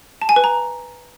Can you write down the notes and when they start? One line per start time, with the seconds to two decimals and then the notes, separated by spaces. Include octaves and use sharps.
0.22 A5
0.29 G#5
0.36 B4
0.44 A#5